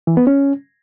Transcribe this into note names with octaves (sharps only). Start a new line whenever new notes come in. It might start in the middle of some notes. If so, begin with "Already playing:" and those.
E3
B3
C#4